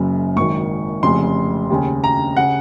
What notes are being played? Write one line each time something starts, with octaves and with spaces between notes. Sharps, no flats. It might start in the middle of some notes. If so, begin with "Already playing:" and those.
Already playing: F#1 F#2 C#3
G#1 F#2 D#3 C#6
F1 F2 C#3 C6
D#2 C#3
A#5
C#3 F#5